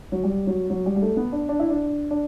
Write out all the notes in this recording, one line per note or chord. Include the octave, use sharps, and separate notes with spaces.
F#3
G3
F#3
F#3
G3
G3
A3
B3
D4
D4
E4
D4
D4